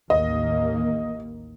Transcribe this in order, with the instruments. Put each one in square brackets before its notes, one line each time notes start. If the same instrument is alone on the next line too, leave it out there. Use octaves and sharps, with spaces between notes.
[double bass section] A1 D#2 A#3 [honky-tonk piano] D#5